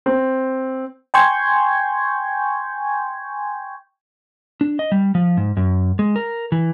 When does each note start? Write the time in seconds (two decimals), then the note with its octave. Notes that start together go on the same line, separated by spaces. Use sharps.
0.06 C4
1.14 G5 G#5 C6 C#6 G6 G#6
4.61 D4
4.79 D#5
4.92 G3
5.15 F3
5.37 G#2
5.57 F#2
5.99 G#3
6.16 A#4
6.52 E3